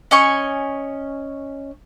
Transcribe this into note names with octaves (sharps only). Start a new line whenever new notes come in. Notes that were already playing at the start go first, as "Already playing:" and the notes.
C#4 D#5 G#5 C#6